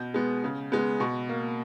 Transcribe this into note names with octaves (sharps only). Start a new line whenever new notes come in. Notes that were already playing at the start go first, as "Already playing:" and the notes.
Already playing: B2 G6
G#3 B3
C#3
G#3 B3
B2 C#6
A#3